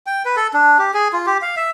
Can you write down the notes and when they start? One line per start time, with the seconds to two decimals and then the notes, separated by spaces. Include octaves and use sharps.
0.07 G5
0.25 B4
0.36 A4
0.54 D4
0.79 G4
0.94 G#4
1.13 F4
1.27 G4
1.42 F5
1.57 E5